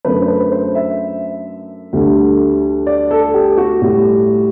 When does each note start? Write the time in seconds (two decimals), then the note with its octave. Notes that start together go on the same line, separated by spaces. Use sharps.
0.05 F#2 D3 A3 B4
0.22 C5
0.28 B4
0.52 C5
0.75 E5
1.93 D2 D3 G3
2.87 D5
3.11 A4
3.34 G4
3.57 F#4
3.81 A2 G3